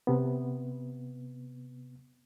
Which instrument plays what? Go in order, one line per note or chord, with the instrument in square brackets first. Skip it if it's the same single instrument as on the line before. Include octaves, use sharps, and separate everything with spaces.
[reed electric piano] C3 B3